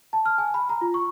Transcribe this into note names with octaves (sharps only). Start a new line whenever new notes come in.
A5
F6
G#5
B5
A#5
F4
C#6